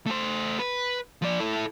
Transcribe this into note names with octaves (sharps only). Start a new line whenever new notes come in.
A3 C5
B4
F3 D5
E4 A4